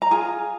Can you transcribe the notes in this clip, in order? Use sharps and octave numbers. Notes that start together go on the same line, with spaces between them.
A#5
F4 G#4 G#5